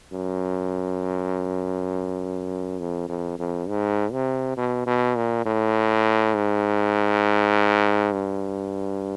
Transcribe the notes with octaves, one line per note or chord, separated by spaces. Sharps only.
F#2
F2
F2
F2
G#2
C3
B2
B2
A#2
A2
G#2
G2